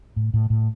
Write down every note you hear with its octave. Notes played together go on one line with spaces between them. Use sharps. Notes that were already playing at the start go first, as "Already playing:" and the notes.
A2
A2
A2